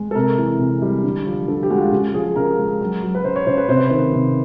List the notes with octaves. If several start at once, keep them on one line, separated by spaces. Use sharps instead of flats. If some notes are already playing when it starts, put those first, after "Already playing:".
Already playing: G#3
A4
C3 A#4
E3
C3
G3
D3
F3
D3 A4
G4
G#3 F#4
F4
C#3 F#4
F3 G#4
C#3 A#4
G#3
F#3
F#3
B4
C#3 C5
C#5
C#3 C5
B4
C3 C5
B4
D#3 C5
C3